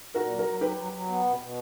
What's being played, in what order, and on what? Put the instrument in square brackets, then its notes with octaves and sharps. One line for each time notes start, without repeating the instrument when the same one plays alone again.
[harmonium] A#2 [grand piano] F#4 A#4
[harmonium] F#3
[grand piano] F#4 A#4
[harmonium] F#3
[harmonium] F#3 [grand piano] G4 B4
[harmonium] F#3
F#3
B3
B2
B2